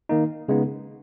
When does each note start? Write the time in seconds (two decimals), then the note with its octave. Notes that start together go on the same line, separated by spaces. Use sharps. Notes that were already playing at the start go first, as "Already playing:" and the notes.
0.09 D#3 A#3 D#4
0.48 C#3 G#3 B3 D#4